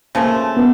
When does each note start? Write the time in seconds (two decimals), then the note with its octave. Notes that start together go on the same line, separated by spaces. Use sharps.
0.15 C#3 F3 A3 A#3
0.57 B3